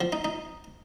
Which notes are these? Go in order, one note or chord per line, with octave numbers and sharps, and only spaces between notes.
F3
D#4
D#4